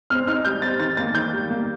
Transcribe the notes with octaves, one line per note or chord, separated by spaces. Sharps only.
C4 F6
D#4 F6
G3 G6
C4 A6
D#3 A6
A#3 A6
D#3 G6
G3
A#3